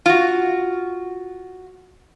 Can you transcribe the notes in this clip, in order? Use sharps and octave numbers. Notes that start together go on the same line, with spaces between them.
F4 F#4